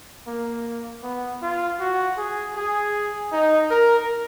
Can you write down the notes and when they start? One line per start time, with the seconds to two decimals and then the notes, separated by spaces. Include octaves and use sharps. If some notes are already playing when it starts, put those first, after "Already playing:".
0.27 A#3
1.03 B3
1.42 F4
1.80 F#4
2.18 G#4
2.56 G#4
3.32 D#4
3.71 A#4